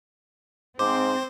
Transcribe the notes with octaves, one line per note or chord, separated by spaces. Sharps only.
G#2 C4 C5 D6